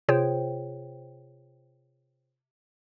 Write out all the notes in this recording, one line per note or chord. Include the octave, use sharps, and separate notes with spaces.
C3 F4 G#4 C5 C#5 G5